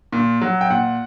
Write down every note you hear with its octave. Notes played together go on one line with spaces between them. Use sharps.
A#2
F#3
G5
A#2 F#5